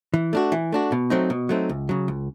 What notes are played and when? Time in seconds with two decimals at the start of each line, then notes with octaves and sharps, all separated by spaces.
0.14 E3
0.33 A3 D4 F#4
0.52 E3
0.72 A3 D4 F#4
0.92 B2
1.10 F#3 A3 C4 D#4
1.30 B2
1.49 F#3 A3 C4 D#4
1.69 C#2
1.89 C#3 F#3
2.08 C#2